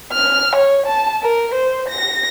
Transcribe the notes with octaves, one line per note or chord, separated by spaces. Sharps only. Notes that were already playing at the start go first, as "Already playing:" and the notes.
F6
C#5
A5
A#4
C5
A#6